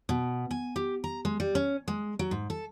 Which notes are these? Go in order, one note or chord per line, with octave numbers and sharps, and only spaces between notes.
B2
G#5
G4
A#5
G#3
G3
C#4
G#3
F#3
G#2
A4